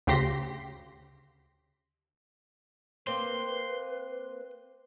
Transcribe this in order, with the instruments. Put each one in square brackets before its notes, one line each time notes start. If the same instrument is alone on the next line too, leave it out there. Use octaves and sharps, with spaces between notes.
[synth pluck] D2 C#3 G4 C6 A#6 B6
[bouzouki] A#3 C4 [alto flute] B4 [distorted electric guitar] C6